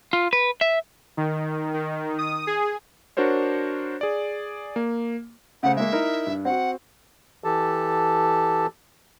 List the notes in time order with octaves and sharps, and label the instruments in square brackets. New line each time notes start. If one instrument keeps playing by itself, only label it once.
[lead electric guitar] F4
B4
E5
[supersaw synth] D#3
D#3
D#6
G#4
[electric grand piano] D4 F#4 A#4 C5 C#5
G#4 D5
A#3
[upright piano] C#3 A3 C5 [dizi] F#5
[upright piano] G#3 A#3 [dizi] E5
[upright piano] D#4 E4 A#4
G2
[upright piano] C4 F#4 [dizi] F#5
[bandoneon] E3 G4 A4 A5